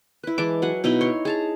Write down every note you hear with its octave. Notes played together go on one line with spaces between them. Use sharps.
E4 B4
E3 G#3 A5 D6
F#3 F#5 G#5
B2 D#4 E4 D#5
C#5 C6
G#4 A5 A#5